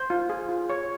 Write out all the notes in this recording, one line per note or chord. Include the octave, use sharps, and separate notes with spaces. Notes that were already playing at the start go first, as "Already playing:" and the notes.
Already playing: C5
F4
G#4
F4
C#5